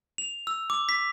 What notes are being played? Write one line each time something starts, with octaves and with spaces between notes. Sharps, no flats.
F7
E6
D6
B6